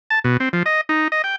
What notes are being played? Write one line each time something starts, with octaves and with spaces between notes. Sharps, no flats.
A5
B2
C4
F3
D#5
D#4
D#5
G5